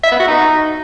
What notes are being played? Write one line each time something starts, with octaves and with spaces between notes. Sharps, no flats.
E5
B3
F#4
D#4